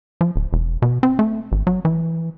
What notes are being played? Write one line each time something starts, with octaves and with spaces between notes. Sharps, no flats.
F3
D1
E1
B2
C4
A3
G#1
F#3
E3